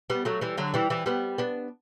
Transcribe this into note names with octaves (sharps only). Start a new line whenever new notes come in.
G3 B3
F#3 A3
E3 G3
D3 F#3
E3 G3
E3 G3
G3 B3
B3 D4